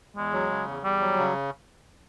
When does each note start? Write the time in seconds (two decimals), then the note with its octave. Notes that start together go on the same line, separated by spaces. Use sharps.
0.17 E2 G#3
0.33 F#3
0.50 C#3
0.68 E2
0.83 E2 G3
1.01 F#3
1.17 C#3